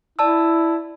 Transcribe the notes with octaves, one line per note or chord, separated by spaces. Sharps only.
E4 D5 A5 E6